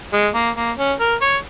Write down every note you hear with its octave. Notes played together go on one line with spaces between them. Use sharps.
G#3
A#3
A#3
C#4
A#4
C#5